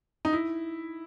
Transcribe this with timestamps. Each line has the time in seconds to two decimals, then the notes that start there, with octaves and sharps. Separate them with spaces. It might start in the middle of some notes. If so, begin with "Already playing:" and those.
0.25 D#4
0.33 E4